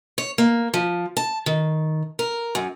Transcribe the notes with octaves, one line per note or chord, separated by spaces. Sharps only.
C#5
A#3
F3
A5
D#3
A#4
F#2